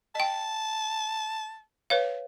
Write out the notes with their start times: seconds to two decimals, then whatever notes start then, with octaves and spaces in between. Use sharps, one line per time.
0.15 D#5 G5 A5
1.90 B4 C#5 F5